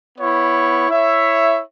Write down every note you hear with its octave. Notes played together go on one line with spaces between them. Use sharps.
B3 E4 C#5
E4 C#5 E5